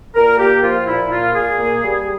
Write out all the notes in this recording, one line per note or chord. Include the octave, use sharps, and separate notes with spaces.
A#2 A#4
A#3 G4
F3 F4
A#2 E4
A#3 F4
A#2 G#4
A#3
G3